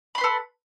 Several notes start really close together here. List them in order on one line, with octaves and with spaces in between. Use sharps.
B5 C6 B4 A4